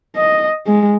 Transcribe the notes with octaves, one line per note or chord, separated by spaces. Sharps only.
D#5
G#3